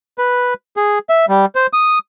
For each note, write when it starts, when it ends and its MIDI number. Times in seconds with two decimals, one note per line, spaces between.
0.18 0.54 71
0.77 0.99 68
1.09 1.25 76
1.29 1.46 55
1.55 1.67 72
1.73 1.99 87